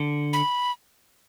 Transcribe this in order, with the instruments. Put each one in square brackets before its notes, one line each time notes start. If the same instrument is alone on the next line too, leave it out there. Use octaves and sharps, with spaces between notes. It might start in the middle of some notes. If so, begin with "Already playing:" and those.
Already playing: [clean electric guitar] D3
[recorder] B5